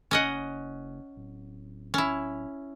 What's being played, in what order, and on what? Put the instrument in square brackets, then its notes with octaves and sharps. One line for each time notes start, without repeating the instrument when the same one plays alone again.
[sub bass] F#1 [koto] C#4 D#5 F#5
[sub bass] D1
[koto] C#4 E4